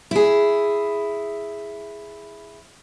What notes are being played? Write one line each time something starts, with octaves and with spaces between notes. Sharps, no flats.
E4 G#4